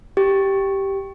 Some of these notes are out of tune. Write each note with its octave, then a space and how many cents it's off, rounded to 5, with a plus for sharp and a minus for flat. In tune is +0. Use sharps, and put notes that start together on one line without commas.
G4 -5